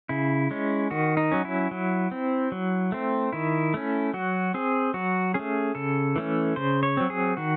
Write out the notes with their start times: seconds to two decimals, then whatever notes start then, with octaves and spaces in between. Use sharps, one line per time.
0.09 C#3 E4
0.51 G#3 C#4
0.91 D#3 F#4
1.17 D#4
1.32 F#3 C#4
1.45 E4
1.71 F#3
2.11 C4
2.52 F#3
2.92 A3 C4
3.33 D#3 E4
3.74 A3 C#4
4.14 F#3 F#4
4.54 C4 G#4
4.94 F#3 F#4
5.34 A3 C#4 G#4
5.75 C#3 A4
6.16 E3 A3 C#4
6.56 C#3 C5
6.83 C#5
6.97 F#3 C4
7.10 G#4
7.37 D#3 F#4